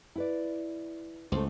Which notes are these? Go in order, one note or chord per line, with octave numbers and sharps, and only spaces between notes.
E4 B4 D5
C#2 A3 C5